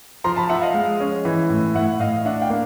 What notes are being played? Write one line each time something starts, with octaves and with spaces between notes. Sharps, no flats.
F3 A#5 C6
A5 B5
F3 E5 F#5
D#5 F5
G#3
C#4
E3
A2
A2 E5 F#5
A2 D#5 F5
D4 E5 F#5
F5 G5
A#3